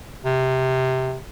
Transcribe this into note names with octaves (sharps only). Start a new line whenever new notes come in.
C3